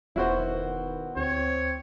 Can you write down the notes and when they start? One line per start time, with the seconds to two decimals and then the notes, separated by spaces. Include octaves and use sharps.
0.16 E1 B2 D#3 B3 E4 F#4 C5
1.17 D2 C4 C#5